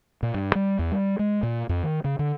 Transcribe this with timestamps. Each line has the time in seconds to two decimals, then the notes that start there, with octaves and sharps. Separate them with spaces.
0.23 A#2
0.34 G2
0.55 G3
0.79 E2
0.92 G3
1.19 G#3
1.43 A#2
1.69 F2
1.83 D#3
2.04 C#3
2.19 D3